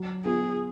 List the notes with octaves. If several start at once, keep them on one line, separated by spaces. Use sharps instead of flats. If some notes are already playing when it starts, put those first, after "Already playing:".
Already playing: F#3
B3 F4 G#4